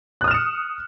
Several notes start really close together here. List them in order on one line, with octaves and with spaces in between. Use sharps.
F#6 D#6 F6 E7 C#7